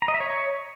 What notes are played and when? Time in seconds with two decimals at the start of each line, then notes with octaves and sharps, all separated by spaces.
0.02 A#5
0.08 D#5
0.14 E5
0.20 C#5